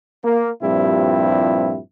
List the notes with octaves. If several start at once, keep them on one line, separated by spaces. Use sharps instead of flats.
A#3
G2 A#2 F3 G3 C4 E4